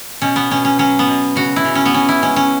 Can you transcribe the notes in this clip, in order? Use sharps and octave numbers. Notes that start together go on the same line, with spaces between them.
B2 C#4
B3
B2 C#4
C#4
F#3 C#4
B3
B2
C#3 F#4
E4
C#3
C#4
B3
C#3 C#4
E4
G#3 C#4
C#4